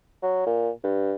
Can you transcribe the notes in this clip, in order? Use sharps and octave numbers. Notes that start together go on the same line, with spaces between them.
F#3
A#2
G2